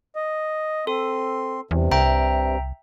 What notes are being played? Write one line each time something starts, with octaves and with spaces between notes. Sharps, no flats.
D#5
C4 A4 C6
E2 G2 C3
C2 E5 G5 A#5